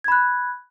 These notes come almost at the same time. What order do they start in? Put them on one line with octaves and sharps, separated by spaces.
G#6 B5 F#6